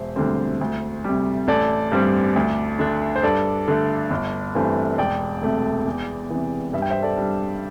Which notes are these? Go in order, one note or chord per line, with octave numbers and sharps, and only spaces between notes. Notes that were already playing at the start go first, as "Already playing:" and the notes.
Already playing: E1 C5 E5
D2 D3 G3 C4
D2
C3 G3
A1 A4 D5
G2 G3 C4
D2
D3 A3 D4
C5
G2 A4 D5
D3 A3
G1
G2 E3 A3 C4
E1 D5 G5
D2 C3 A3
E2
C3 E3
G2 E5
G5
C5 E5
A4 D5
G3 D4